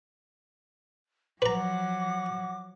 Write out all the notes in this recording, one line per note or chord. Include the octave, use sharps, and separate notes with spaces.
F3 F#3 B4 F#5 A#5 D6